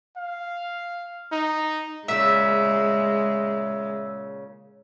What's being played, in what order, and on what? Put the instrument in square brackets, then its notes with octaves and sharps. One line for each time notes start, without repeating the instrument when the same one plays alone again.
[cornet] F5
D#4
[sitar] A#2 C#3 [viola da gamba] G#3 [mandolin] E5